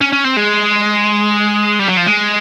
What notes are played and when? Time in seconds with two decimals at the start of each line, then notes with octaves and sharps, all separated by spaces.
0.01 C#4
0.12 C#4
0.24 C4
0.37 G#3
1.79 G3
1.88 F#3
1.97 F3
2.06 G#3